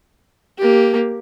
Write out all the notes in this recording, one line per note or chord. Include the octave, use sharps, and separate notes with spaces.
A#3 G4